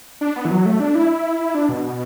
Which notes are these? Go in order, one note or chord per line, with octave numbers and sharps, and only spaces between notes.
D4
B3
E3
F#3
A3
D4
E4
D4
B2
B2